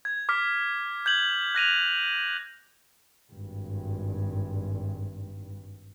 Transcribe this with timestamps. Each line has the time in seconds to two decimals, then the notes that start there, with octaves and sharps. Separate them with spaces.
0.05 G#6
0.29 D6 F6 B6
1.06 G6 G#6 F#7
1.55 F#6 A#6 D#7 F7
3.33 G#1 G2